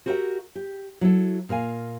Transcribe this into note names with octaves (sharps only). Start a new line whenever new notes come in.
F#4 G4 A#4 B4 E5 F#5
G4
F#3 E4 A4
A#2 A#4 F5 G#5